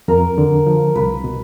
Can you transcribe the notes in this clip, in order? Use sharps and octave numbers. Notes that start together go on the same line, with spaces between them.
F2 A#4
D3
F3
C2 B4
B2